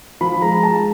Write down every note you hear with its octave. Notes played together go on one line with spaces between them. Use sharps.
F3 B5
G#3 A#5
G#3 A5